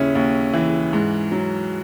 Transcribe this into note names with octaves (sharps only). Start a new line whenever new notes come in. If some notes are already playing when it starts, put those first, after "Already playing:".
Already playing: D#2 C#3 C#4 E4
D#2
E3
G#2
F#3